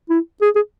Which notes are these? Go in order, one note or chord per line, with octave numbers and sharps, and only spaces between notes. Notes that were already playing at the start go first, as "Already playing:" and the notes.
E4
G#4
G#4